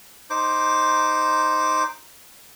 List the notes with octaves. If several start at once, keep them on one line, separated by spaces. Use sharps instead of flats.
D#4 C5 D6